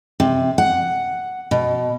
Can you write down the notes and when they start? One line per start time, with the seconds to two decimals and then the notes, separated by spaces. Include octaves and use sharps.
0.20 C3
0.58 F#5
1.51 B2